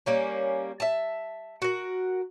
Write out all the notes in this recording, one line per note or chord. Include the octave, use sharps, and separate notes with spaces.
G3 A#3 C#4
E5 A5
F#4 A#4